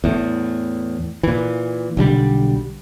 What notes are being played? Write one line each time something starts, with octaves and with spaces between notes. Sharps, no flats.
E2 A2
A#2 E3
B1 D3 F3 G3